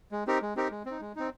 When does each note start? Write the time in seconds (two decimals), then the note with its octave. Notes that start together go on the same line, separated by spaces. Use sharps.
0.12 G#3
0.27 C4 D#4 G4 A#4
0.42 G#3
0.56 C4 D#4 G4 A#4
0.71 G#3
0.86 C4
0.91 D#4
1.01 G#3
1.16 C4 D#4